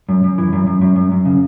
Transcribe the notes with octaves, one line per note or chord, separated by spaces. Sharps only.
F#2
F#2
E3
F#2
F#2
F#2
F#2
F#2
C#3